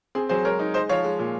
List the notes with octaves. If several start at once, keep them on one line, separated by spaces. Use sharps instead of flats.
C4 G#4
F#3 G#4 C5
G#3 A#4 C#5
D#4
G#3 C5 D#5
F3 C#5 F5
G#3
A#2